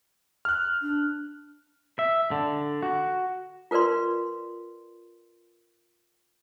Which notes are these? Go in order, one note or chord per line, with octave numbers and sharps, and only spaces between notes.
F6 F#6
D4
E5
D3
F#4
F4 A#4 B4 D5 C6